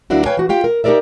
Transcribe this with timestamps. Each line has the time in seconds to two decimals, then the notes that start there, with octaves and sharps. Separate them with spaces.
0.10 D2 F#3 A#3 D4 E4 F#4
0.26 B4 C#5 F5 G5 G#5
0.37 E3 F#4
0.49 F4 G4 G5
0.64 A#4
0.84 D#4 G4 G#4 A#4 D5 E5